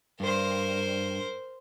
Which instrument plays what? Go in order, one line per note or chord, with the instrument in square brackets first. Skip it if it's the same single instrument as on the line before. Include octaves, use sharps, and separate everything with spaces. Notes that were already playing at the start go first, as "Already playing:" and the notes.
[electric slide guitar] G2 [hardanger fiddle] A#4 C5